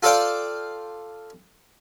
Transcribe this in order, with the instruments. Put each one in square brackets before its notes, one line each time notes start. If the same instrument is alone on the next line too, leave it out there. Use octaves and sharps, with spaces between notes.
[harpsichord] F4 A4 C5 D5 F5 G5